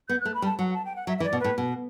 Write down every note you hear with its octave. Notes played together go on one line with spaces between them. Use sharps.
B3 G6
A3 F#6
B5
G3
A5
F#3 F#5
A5
G5
F#5
F#3 E5
E3 E5
D5
B2
A2 B4
B2